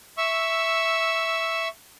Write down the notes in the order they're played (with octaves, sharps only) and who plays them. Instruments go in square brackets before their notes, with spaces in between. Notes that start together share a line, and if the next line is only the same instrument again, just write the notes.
[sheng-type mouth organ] E5 C#6 E6